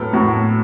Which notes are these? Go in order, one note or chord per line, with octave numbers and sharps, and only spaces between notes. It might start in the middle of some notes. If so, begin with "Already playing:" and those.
Already playing: A2 F#3 B3 A4 A#4
A2 F#4